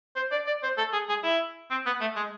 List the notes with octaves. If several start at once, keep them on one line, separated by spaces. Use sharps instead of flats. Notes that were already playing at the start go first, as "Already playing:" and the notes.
C5
D5
D5
C5
A4
G#4
G#4
E4
C4
B3
A3
G#3